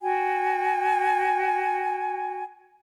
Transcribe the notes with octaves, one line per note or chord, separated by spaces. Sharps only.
F#4 G5 G#5